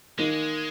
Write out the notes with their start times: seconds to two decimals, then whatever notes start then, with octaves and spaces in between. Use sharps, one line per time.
0.18 D#3 G#3 A#3 D#4